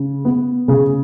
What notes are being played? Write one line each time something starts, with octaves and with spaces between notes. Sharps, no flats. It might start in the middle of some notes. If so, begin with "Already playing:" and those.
Already playing: C#3
B3
C#3 G#4